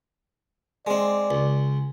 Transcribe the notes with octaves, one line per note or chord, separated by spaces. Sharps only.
G#3 C4 D5
C#2